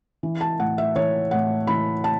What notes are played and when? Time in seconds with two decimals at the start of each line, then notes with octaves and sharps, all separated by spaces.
0.23 E3
0.41 A5
0.60 A2 F#5
0.78 E5
0.96 E3 C#5
1.31 A2 F#5
1.67 E3 B5
2.04 A5